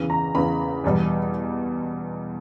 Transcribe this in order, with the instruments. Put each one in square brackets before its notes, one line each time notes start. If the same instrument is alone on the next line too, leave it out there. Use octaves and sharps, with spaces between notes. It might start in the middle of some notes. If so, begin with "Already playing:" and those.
Already playing: [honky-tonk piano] E2 C#3 E3
A#5
E2 C#3 E3 B5
E2 B2 G3